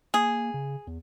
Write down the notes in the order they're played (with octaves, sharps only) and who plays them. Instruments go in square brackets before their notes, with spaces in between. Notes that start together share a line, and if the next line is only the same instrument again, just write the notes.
[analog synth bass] A#3 [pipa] G#4
[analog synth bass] C#3
E2